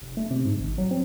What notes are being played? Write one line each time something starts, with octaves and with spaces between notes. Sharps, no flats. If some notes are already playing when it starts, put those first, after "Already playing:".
F1
A3
C3
G#2
G#1
F#3
C4